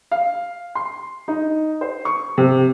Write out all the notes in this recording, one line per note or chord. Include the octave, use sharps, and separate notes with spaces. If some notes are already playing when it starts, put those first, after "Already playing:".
F5
C6
D#4
C5
C#6
C3